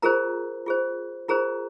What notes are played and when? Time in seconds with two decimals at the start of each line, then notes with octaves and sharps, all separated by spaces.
0.02 F4 G#4 A#4 C5 A#5
0.66 F4 G#4 C5
1.28 F4 G#4 A#4 C5 A#5